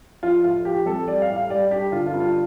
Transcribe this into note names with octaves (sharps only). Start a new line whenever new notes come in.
F3 F4
A2 F4
F3 G4
F2 A4
G3 D5
F5
A2
F5
G3 D5
G2 G4
D3 F4
F4
G2
F4